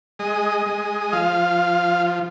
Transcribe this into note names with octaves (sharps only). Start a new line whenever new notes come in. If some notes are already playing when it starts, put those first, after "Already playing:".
G#3 D#5
G#3
F3 F5